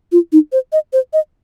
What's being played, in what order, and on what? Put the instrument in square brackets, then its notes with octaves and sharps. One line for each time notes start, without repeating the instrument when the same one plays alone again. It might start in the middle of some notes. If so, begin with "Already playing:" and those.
[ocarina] F4
D#4
C5
D#5
C5
D#5